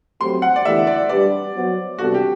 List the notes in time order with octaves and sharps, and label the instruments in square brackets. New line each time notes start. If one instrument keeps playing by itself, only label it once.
[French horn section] F#3 A3 C4 G4 C5 [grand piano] C6
[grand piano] F#5
D5
[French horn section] E2 D3 A3 E4 G4 [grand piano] E5
[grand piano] D5
[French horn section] G3 D4 G4 B4 [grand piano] D5
[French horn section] F#3 B3 F#4 C5
[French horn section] C3 G3 B3 D4 A4 [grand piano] F#4
[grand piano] G4